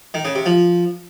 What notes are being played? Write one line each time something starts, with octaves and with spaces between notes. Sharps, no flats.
D#3
C#3
C3
F3